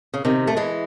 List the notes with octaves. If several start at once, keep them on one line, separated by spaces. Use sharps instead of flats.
C#3
C3 D#3
A3
E3 G#3